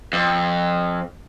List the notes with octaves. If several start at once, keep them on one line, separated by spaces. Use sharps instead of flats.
F2